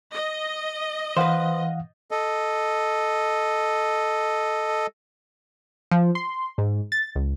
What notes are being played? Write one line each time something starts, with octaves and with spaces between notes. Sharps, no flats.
D#5
E3 B4 C5 F5 F#5
A4 D#5
F3
C6
G#2
A6
C#2